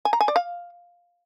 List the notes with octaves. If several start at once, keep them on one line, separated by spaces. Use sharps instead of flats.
G#5
A#5
G#5
D5
F5